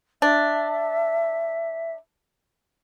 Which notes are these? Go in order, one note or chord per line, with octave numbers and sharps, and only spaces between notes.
D4 E5